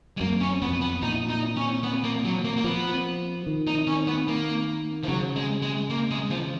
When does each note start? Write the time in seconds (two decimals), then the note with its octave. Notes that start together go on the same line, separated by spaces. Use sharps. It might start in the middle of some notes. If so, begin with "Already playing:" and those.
0.17 G#3
0.20 F#2 A#3
0.41 C#4
0.62 F2 B3
0.81 B3
1.02 A#2 D#4
1.29 D#4
1.56 C#4
1.83 B3
2.04 A#3
2.25 F#3
2.44 A#3
2.57 A#3
2.64 F3 B3
3.47 D#3
3.67 D#4
3.87 C#4
4.07 B3
4.28 A#3
5.03 F3
5.08 C#3 F#3
5.36 G#3
5.62 G#3
5.90 A#3
6.11 G#3
6.30 F3